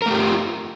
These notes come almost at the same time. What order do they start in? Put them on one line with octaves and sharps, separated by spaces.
A#4 A3 G4 F4